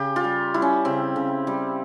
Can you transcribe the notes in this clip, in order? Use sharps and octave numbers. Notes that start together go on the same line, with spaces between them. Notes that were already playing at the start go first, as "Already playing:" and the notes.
Already playing: C#3 G4
F4
G3
G3 E4
C#4
C#3 C4
C#3
G3